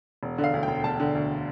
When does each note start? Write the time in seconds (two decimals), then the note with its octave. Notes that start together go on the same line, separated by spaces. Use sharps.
0.23 E1
0.38 D3
0.44 F5
0.54 D2
0.63 G5
0.68 E1
0.84 E1 A5
1.00 D3
1.15 D2